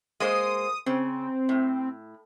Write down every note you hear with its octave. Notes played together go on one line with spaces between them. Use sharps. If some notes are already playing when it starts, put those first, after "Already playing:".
G#3 A#3 C5 D#6
C#3 C4
A2